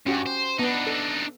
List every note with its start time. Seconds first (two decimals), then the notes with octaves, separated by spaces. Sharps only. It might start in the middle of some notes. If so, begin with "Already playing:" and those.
0.06 G2 C#4 F#4 G4
0.26 C5
0.59 B3 D4 D#4
0.87 A4